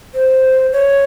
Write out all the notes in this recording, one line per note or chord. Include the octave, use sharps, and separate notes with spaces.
C5
C#5